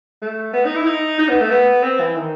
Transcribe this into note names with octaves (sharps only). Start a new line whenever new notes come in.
A3
B3
D#4
E4
D#4
D#4
B3
A3
B3
C4
E3
D#3